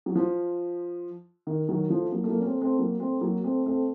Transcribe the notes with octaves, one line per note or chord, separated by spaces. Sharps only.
F#3
F3
D#3
D#3 F#3
F3 A3
F#3 A#3
A3
F#3 A#3
C#4
A3 C4
A3 C4
F#3 A#3
A3 C4
F#3 A#3
A3 C4
A3 C4